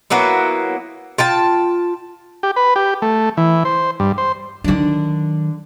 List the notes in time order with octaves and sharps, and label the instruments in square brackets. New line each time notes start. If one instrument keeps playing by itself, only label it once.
[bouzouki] F#3 A#3 B3 E4
F4 G5 A5
[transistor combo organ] G4
B4
G4
A3
E3
C5
G2
C5
[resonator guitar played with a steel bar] D3 D4 [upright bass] D#3 F#3